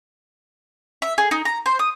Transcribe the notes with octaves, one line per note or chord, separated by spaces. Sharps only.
E5
G#4
D#4
A#5
C5
D#6